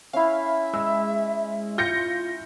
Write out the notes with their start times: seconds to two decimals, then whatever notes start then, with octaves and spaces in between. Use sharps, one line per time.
0.13 C#4 E4 E5 F5
0.74 G#3 E6
1.78 F4 G6 A#6 C#7